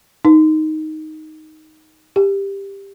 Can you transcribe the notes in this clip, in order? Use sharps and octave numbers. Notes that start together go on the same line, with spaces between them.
D#4
G4